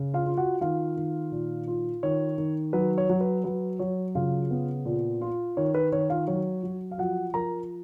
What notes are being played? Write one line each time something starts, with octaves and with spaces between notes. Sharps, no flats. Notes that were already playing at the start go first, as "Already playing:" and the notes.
Already playing: C#3
F4 F5
F4
F#4 F#5
D#3 F4 F5
D#3
A#2
F4
D#3 C#5
D#3
F#3 B4
C#5
F#3
B4
F#3 B4
F#3 C#5
C#3 F4 F5
B3
A#2
F4
D#3 C#5
B4
D#3 C#5
F4 F5
F#3 C#5
F#3
F5
F3 F#4 F#5
F3 A#4 A#5